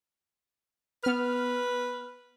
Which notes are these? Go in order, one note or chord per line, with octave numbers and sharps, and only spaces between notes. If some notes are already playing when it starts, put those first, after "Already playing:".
B3 B4 F6